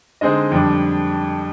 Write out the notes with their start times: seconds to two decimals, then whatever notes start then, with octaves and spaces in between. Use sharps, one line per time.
0.21 D3 G#3 C4 D#4 D#5
0.52 F2 D3 G3 D4